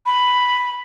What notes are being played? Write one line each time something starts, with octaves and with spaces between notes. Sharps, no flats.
B5